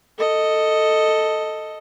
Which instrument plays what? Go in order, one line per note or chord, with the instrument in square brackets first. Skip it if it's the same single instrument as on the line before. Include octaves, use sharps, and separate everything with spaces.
[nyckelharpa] A4 D#5